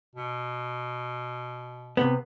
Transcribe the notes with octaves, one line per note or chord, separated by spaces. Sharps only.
B2
C3 B3